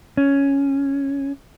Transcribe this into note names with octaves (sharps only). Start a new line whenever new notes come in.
C#4